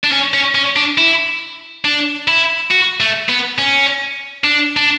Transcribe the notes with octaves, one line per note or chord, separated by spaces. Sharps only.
D4
C#4
C#4
C#4
D4
E4
D4
E4
F#4
A3
B3
C#4
D4
D4